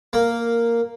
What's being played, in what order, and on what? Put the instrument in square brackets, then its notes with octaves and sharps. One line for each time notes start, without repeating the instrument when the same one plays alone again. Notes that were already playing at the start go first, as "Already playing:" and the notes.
[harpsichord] A#3